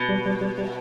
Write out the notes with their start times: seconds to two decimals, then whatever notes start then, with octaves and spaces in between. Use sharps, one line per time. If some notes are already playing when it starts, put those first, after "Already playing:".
Already playing: B2
0.09 G3
0.26 G3
0.41 G3
0.58 G3